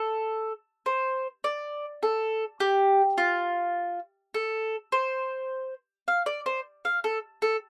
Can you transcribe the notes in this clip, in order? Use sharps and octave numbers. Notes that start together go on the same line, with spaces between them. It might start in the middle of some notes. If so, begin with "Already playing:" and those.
Already playing: A4
C5
D5
A4
G4
F4
A4
C5
F5
D5
C5
F5
A4
A4